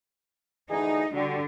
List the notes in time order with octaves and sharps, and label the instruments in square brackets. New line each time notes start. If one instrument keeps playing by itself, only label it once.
[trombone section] D2 E3 G#4 [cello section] D#4
[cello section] D3 [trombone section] G3 F#4